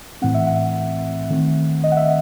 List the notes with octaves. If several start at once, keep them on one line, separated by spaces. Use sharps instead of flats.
A2 E3 A3 C4 F#5
E5
F#5
D#3 A3 C4
D#5
F#5
E5